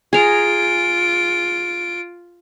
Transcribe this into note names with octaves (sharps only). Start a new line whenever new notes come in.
F4 G#4 A#5 D7